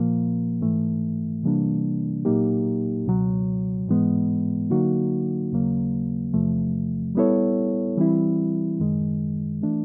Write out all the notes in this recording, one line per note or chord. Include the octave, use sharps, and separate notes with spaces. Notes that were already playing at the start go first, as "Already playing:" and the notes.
Already playing: A#2 F3 A#3
G#2 E3 A3
C3 E3 G3 A#3 D4
A#2 F#3 A#3 D#4 G4
C#2 B2 F#3
G#2 E3 G#3 B3
D3 F#3 A#3 D#4 F#4
D#2 C#3 F#3 A#3
E2 C3 F3 A3
G3 B3 E4 A4 C#5
E3 G3 C4 E4
F#2 D#3 G#3
E3 A3 D4